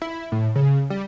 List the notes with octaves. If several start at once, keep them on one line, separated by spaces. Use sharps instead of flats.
E4
A2
C#3
G3